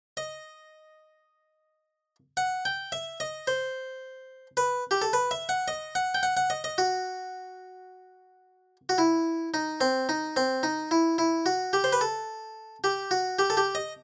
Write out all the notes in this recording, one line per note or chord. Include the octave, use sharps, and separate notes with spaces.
D#5
F#5
G5
E5
D#5
C5
B4
G4
A4
B4
E5
F#5
D#5
F#5
G5
F#5
F#5
D#5
D#5
F#4
F#4
E4
D#4
C4
D#4
C4
D#4
E4
E4
F#4
G4
C5
B4
A4
G4
F#4
G4
A4
G4
D#5